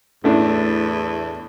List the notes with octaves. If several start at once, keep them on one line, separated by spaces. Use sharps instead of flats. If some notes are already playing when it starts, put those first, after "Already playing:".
E2 A2 A3 D4